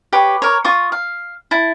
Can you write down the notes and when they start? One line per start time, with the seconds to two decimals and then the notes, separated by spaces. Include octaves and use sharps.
0.13 G4 B4 C#5
0.42 A#4 C#5
0.64 F4 C#6 D#6
0.92 F5
1.51 E4 A5